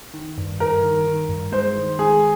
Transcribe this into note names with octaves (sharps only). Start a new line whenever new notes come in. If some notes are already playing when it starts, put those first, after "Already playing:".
D#3
G2
G2 A#4
D#3
D#3
G2
G#3 C5
D#3
G#3 G#4